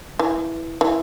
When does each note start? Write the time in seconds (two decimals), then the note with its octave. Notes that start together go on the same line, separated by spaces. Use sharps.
0.19 E3
0.81 E3